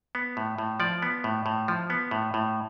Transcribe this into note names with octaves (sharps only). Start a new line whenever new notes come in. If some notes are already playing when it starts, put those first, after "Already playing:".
B3
A2
A2
F3 D5
B3
A2
A2
F3
B3
A2
A2